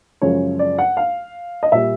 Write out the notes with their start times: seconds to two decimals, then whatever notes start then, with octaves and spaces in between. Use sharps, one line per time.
0.22 F#2 C#3 F3 G#3 C#5
0.59 D5
0.78 F#5
0.97 F5
1.63 D#5
1.72 A#2 G3 E5